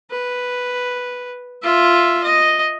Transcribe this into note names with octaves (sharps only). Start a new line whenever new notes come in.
B4
F4 E5
D#5